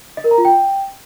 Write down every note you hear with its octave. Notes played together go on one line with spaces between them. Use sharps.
D#5
A#4
A#5
F4
G5